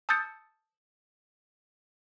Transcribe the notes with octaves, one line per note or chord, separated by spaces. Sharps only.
A5 D#6 E6 G6 A6 C#7